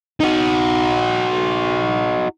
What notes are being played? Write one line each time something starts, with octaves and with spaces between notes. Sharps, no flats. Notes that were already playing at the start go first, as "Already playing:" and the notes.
D#4 F#4